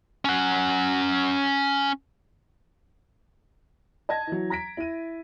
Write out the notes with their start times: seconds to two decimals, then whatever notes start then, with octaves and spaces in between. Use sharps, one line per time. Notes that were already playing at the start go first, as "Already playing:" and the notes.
0.25 C#4 F#5
4.09 D#5 A5 G#6 A#6
4.27 E3 F#3
4.50 A#5 A#6 B6 D7
4.77 E4 D#7